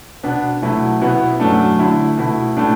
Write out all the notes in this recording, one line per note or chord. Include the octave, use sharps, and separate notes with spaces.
B2 B3 D4
B2 F#3 A3 E4
B2 B3 E4
F#2 F#3 A3 D4
D3 A3 E4
B2 A3 E4
A2 A3 D4